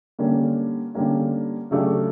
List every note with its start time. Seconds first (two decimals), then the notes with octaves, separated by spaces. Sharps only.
0.18 D3 G3 A#3 C#4
0.95 D3 G3 A#3 C#4
1.71 C#3 F#3 A3 D4 G4